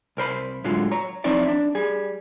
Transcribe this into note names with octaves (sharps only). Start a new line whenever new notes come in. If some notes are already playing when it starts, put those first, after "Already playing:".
C2 A#4 C5 B5
A2 D3 F#3 G#3 F4
C#5 A#5
F3 C4 D#4 E4 C#5 D5
D4
G3 G#4